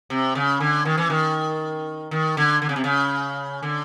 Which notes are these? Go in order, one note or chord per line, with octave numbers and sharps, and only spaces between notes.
C3
C#3
D3
D#3
E3
D#3
D#3
D3
D3
C#3
C3
C#3
D3